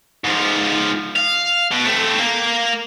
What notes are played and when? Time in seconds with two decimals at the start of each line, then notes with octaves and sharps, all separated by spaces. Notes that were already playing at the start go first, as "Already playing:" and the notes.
0.24 G#2 F3
1.16 F5
1.71 B2
1.85 A3 C4
2.20 A#3